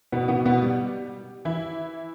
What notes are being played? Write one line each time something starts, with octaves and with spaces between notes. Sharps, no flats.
B2 B3
B2 B3
B2 B3
G3
E3 E4